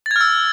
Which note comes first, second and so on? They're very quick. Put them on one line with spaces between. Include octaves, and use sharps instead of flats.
A6 G#6 F6 E6